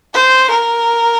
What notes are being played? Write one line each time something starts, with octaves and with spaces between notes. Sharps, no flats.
C5
A#4